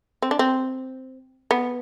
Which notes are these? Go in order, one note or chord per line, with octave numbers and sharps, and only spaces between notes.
C4
D4
C4
B3